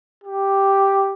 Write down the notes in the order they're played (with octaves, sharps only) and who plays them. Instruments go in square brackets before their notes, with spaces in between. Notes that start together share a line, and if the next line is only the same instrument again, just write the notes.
[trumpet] G4